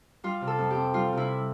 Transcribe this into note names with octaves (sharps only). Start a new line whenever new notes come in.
G3 F4
C3
A4
F2
G4
C4
G3 F4
C3 E4